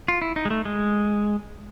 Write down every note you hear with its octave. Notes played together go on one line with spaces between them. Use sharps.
F4
E4
D#4
G#3
A3
G#3